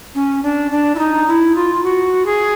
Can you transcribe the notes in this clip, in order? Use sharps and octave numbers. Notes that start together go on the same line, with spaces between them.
C#4
D4
D4
E4
D#4
E4
F4
F#4
G#4